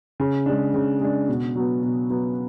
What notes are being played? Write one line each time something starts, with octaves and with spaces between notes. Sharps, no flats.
C#3
G#3 D4
C#3
G#3 D4
B2
F#3 B3
B2
F#3 B3